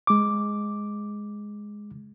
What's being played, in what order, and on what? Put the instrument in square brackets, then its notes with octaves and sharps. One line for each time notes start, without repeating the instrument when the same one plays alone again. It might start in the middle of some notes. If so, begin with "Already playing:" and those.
[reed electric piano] G#3 D6